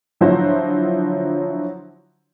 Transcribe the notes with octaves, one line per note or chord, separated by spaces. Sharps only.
D3 F3 F#3 E4 F#4 C5